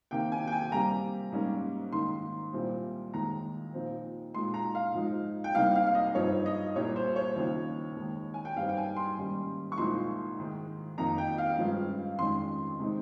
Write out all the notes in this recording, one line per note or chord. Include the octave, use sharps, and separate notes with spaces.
C3 D#3 A#3 G5
G#5
G5
G#5
C3 G3 A#3 A#5
G#2 G3 A#3 C#4
G#2 D#3 A#3 C6
C2 A#2 G3 C4
D#2 D#3 G#3 A#5
A#2 F3 C4 D#4
A#2 G#3 D#4 C6
A#5
F5
G#2 F3 G#3 D#4
G5
C2 C3 G3 A#3 D#4 F5
F5
F5
D#5
G2 F3 C4 D#4 C#5
D#5
C2 A#2 G3 A#3 C#5
C5
C#5
D#2 C#3 F3 C4 D#4
D#2 D#3 G#3 D#4
G#5
G5
G2 G3 C4 D#4 F5
G5
G#5
C6
G#2 D#3 G3 A#3 C#4
C#6
C2 A#2 F3 G#3 D#4 C6
G#2 D#3 G#3
F2 D#3 A#3 D#4 A#5
G5
F5
G2 F3 G#3 C#4
F2 D#3 G#3 C#4 C6
C3 D#3 G#3 C4 D#4